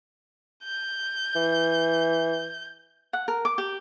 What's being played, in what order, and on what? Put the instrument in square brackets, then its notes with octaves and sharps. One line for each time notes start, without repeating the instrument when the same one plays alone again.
[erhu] G6
[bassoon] E3
[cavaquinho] F#5
A#4
D6
G4